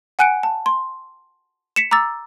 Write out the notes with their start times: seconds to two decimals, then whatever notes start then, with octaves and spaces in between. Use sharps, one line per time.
0.19 F#5 G#5 F#6 C#7 D7
0.43 A5
0.66 C6
1.76 B6 C#7 E7
1.91 A#5 D6 E6 A6